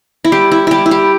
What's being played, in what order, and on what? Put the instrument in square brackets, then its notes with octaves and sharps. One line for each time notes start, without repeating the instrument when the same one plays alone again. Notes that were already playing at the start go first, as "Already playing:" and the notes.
[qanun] E4
G3 G4
E4
G3 E4 G4
E4
G4